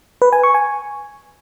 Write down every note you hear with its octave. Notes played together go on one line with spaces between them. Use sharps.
B4
G#5
C#6
G#5